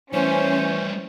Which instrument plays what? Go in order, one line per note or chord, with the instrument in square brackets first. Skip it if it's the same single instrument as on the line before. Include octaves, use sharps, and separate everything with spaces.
[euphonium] E3 [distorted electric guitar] G3 A3 [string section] C#4 [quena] C5